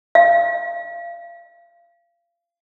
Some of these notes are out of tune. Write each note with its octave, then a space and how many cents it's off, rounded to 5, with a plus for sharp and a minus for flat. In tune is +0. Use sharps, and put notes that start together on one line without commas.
F5 -25